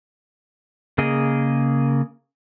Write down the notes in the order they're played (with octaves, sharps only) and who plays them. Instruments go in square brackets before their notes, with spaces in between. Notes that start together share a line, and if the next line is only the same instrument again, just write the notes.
[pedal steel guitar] C#3 A#3 G#4 A#4 D#5